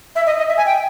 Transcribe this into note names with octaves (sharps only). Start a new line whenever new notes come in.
E5
D#5
D#5
E5
G#5
G5